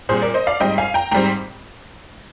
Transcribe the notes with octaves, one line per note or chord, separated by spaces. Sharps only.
A#2 G3 C4 G#4 C5
A#4 D5
C5 D#5
D5 F5
G#2 G3 C4 D#5 G5
F5 G#5
G5 A#5
G#2 G3 C4 G5 A#5